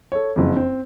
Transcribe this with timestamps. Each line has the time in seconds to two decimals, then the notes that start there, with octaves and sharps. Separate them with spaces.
0.12 A4 C#5
0.36 F#1 F2
0.57 C4